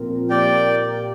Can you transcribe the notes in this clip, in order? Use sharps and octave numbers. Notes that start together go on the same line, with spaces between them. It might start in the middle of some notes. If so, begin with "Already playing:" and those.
Already playing: A#2 F3 C4 F4 A#4
A#2 A#3 G4 A#4 D5 G5